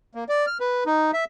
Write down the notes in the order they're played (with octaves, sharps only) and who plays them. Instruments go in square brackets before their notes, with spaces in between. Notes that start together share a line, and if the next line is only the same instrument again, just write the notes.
[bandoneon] A#3
D5
F6
B4
D#4
E5